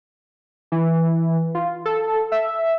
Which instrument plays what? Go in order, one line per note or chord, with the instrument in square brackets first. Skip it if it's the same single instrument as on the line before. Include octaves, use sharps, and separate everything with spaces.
[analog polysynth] E3
F4
A4
E5